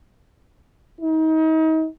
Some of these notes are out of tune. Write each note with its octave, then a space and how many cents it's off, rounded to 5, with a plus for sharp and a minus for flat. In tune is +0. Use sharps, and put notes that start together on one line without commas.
D#4 +35